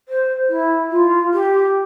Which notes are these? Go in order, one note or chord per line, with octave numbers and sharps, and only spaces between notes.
C5
E4
F4
G4